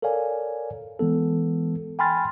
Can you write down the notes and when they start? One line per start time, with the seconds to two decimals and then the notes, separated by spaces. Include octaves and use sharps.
0.02 A4 A#4 C#5 D5 F5 G#5
1.00 E3 G#3 B3 A4
1.99 G5 G#5 B5 C6 F6 A6